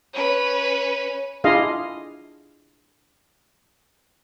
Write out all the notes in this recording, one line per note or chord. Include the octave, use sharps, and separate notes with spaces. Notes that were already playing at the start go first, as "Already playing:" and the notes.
C#4 B4
D4 E4 F4 G#4 D#5 F5